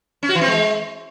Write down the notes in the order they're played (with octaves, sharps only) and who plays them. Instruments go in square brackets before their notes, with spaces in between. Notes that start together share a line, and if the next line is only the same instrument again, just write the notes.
[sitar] C#4
F#4
E3
C4
G#3